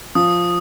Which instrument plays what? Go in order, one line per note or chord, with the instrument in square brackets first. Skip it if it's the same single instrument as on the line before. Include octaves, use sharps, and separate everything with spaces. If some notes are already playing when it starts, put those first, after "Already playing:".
[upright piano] F3 [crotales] D#6